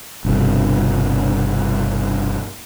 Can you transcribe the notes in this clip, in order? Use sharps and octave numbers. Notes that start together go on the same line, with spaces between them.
G1 C2 B2 D3